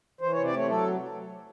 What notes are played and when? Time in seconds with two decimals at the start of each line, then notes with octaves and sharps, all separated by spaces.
0.21 E3 C5
0.32 C#5
0.37 C3
0.44 D5
0.52 A3 C#5
0.68 F#3 A4